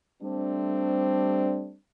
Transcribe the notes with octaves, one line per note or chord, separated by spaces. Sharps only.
G3 A3 C4 D4